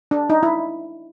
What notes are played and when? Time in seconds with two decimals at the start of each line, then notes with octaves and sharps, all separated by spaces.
0.11 D4
0.30 D#4
0.43 E4